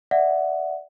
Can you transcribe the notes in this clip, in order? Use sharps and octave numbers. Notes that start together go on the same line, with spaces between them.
D5 E5 F#5